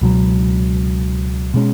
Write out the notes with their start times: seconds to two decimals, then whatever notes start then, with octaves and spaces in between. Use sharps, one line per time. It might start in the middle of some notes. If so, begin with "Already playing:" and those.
0.01 C#2 B2 F#3
1.54 B2 G#3 C#4